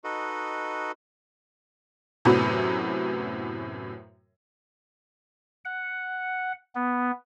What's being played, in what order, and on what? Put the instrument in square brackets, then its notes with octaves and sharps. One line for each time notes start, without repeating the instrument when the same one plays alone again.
[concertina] D#4 F#4 A4 B4 D#5
[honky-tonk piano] F#2 A2 C3 F#3 B3
[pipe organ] F#5
B3